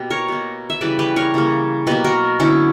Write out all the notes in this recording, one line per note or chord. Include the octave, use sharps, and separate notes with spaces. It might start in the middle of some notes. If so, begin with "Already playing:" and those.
Already playing: B2 A#3 G4
A#4 C#5
B2 A#3
E5
C#3 E3 G3 B4 D5
G4 B4
A#4 C#5
C#3 E3 G3 A#3
B2 F#3 A#3 G4 B4
F#4 A#4
D3 F#3 B3 C#4 E4